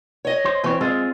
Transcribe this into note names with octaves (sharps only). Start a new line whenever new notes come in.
C#5 D#5
C5
E3 C4 E4 C#5
G#3 C4 F4 G#4